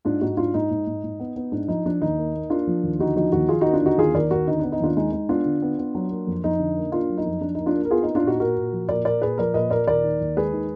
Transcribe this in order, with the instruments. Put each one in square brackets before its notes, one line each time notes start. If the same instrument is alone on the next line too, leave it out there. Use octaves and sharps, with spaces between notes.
[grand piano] G#2 D4 F4
G#2 D#4 F#4
G#2 D4 F4
G#2 D#4
G#2
G#2
G#2
B3
B3
G#2 D4
F3 D#4
F3 D4
D#2 D#4
A#3
A#3
A#3 D4 F4
F3
D#2
D3 D#4 F#4
F3 D#4 F#4
D#2 D#4 F#4
D#2 F4 G#4
A#3 D#4 F#4
D4 F4
D3 D#4 F#4
D#2 F4 G#4
D#2 A#4 D5
D#2 F#4 A#4
D3 D#4
B3 D4
D#4
D#2 D4 F4
G#3 D#4
G#3 D#4
B3 D4 F4
D3
B3
B3
F#3
A#3
F2
F2 D#4
D3
A#3
A#3 D4 F4
F#3
D#4
F2
F2 D4
A#3 D#4
D4 F4
A#3
A#4
B3 F4 G#4
B3 D#4
D4 F4
A#2 D#4 F#4
A#2 F#4 A#4
A#2
F3
A#2 A#4 D5
A#2 A#4 D5
A#2 G#4 B4
F3 A#4 D5
A#2 B4 D#5
A#2 A#4 D5
D#2 A#4 D5
D#3
D#2
G#3 G#4 B4
D#3